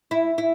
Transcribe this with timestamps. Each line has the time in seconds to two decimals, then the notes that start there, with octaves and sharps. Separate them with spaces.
0.11 E4
0.38 E4